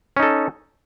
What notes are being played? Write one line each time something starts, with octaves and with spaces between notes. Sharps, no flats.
C#4 D#4 A4